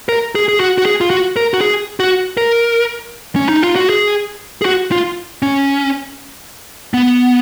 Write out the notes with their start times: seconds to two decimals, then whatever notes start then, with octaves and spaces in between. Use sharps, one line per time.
0.09 A#4
0.35 G#4
0.49 G#4
0.60 F#4
0.78 F#4
0.86 G#4
1.01 F4
1.10 F#4
1.36 A#4
1.54 F#4
1.61 G#4
2.00 F#4
2.37 A#4
3.36 C#4
3.49 D#4
3.63 F4
3.76 F#4
3.90 G#4
4.62 G#4
4.65 F#4
4.92 F4
5.42 C#4
6.94 B3